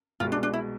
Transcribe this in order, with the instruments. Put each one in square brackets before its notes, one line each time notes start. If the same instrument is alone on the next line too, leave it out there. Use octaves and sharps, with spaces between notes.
[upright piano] C2 B2 G#3 [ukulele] F4
[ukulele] D4
D4
E4